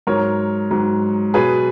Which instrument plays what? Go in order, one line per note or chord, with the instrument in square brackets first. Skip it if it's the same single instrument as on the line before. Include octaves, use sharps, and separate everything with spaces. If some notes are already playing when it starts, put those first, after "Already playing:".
[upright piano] G#2 F#3 A#4 C#5
G#2 F#3
B2 F#3 G#4 B4